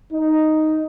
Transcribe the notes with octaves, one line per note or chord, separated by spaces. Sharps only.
D#4